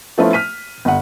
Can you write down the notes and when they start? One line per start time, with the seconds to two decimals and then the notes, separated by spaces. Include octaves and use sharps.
0.18 F3 A3 B3 C#4 E4 F4
0.33 F6 B6 D#7
0.85 G1 F#5